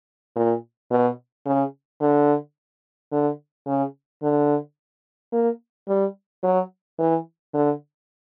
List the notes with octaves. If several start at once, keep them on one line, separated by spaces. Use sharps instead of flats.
A#2
B2
C#3
D3
D3
C#3
D3
A#3
G3
F#3
E3
D3